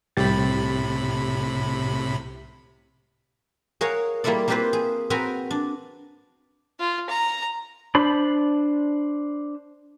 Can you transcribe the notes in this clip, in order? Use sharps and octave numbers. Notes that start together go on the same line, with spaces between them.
C2 A2 C3 G4 B5 A6
G#4 A#4 C#5 F5 F#5
G3 A#3 E4 F4 A4 D5
A#3 C4 F4 G4 B4 C5
G#4
C4 F#4 A#4 B4 G#5 A#5
D4
F4
A#5
D4 C5 A5 B5